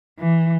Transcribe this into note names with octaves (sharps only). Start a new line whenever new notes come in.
E3